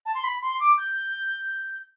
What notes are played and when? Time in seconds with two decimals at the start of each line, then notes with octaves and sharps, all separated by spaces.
0.06 A5
0.14 C6
0.24 B5
0.42 C6
0.60 D6
0.78 G6